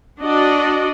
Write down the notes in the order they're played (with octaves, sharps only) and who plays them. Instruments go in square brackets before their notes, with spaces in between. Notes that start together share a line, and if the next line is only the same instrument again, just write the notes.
[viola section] D4 F#4 D5 D#5